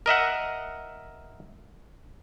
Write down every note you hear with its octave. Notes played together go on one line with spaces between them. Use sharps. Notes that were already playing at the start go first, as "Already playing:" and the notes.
A#4 D#5 E5 F#5